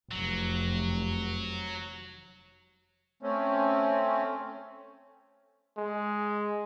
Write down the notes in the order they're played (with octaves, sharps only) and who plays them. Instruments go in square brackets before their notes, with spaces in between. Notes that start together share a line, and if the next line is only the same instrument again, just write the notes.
[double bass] F1 [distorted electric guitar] F#3
[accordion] A3 C4 C#4
[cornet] G#3